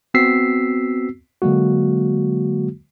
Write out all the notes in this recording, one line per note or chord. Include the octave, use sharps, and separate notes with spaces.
B3 C4 F#4 E6 B6 C7
D3 F#3 G#3 A#3 F#4